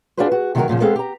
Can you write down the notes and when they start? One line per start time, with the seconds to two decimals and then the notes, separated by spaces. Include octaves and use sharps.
0.17 D4 F4 F#4 G#4 B4 C5
0.32 F#4
0.55 C3 D#3 F#3 E4 F#4 A#4
0.68 F#2 A#2 C#3 F3
0.80 G#3 B3 C4 G#4 A4 F5
0.96 G4 A#5